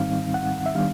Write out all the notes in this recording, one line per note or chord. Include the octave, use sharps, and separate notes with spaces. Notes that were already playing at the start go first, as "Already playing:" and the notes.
Already playing: G#2 D#3 G3 C4 D#4 F5
F#5
E5
D#3 G3 B3 D4 F5